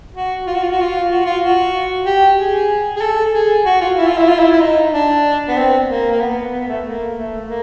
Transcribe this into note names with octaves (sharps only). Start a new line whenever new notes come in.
F#4
F4
F#4
F4
F#4
F4
F#4
F4
F#4
G4
G#4
G#4
A4
G#4
F#4
F4
E4
F4
E4
F4
E4
E4
D#4
D4
B3
C4
A#3
A#3
B3
B3
A3
A#3
A3
A#3